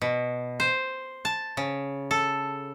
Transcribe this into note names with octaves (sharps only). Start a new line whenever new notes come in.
B2
C5
A5
C#3
A4